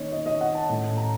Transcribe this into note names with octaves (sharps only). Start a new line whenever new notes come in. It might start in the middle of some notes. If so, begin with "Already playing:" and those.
Already playing: D#3 A#3 C#4 C#5 D#5
D#5
D#5
F#5
A5
A2 A3 C#4
A#5